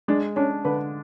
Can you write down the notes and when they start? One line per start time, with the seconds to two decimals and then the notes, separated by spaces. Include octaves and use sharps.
0.08 G#3 D4
0.36 C#4 D4
0.65 D3 B4